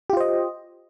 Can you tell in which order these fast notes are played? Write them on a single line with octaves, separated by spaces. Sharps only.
G4 F4 C5 D#5